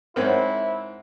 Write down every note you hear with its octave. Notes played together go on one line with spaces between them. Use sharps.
G#2 C4 E4 A#4 C5 C#5 F#5